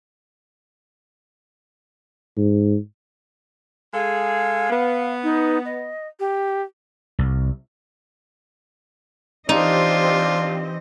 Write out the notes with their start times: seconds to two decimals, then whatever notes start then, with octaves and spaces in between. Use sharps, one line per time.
2.37 G#2
3.94 G#3 G#4 A4 F5
4.70 B3
5.23 D#4
5.65 D#5
6.20 G4
7.19 C2
9.49 E3 C4 D4 D#4 F4 G4 C5 D#5